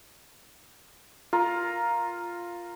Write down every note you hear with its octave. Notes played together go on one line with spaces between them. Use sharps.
F4 A#4